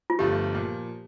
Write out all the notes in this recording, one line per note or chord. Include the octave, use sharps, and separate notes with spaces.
F4
G1 G2 F3 A3 G4
A#2 F3